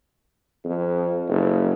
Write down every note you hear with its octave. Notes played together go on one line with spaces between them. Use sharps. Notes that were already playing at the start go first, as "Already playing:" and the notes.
F2
F#1